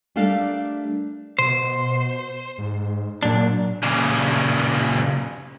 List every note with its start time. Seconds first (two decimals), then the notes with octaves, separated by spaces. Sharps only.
0.16 G3 A3 D4 A#4 F5
1.39 B2 C5
2.58 G#2
3.23 A#2 F#3 D4
3.83 A#2 C#3